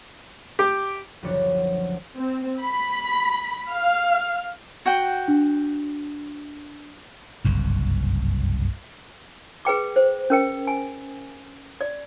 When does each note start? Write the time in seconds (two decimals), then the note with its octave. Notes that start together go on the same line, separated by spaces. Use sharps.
0.59 G4 D6
1.23 F#1 D2 F3 F#4 C#5 D5
2.18 C4
2.62 B5
3.72 F5
4.86 F#4 F#5 G5
5.28 D4
7.45 F#1 C2 G2
9.65 G#4 B4 G5 D6
9.96 C5
10.30 C#4 A#4 G5
10.67 G#5
11.81 D5